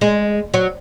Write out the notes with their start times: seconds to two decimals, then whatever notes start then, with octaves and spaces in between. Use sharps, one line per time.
0.01 G#3
0.54 F#3